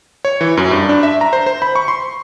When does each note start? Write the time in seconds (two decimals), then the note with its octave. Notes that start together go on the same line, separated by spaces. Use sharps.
0.25 C#5
0.41 E3
0.57 F#2
0.71 G2
0.89 D4
1.03 E5
1.21 A#5
1.33 C5
1.46 C5
1.62 B5
1.76 C#6
1.88 C6